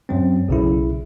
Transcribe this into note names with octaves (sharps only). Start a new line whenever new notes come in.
F#2 F#3 C4
B1 C#3 E4